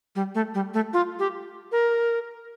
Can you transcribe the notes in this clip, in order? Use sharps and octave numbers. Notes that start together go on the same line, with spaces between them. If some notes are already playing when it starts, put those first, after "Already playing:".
G3
A3
G3
A3
F4
G4
A#4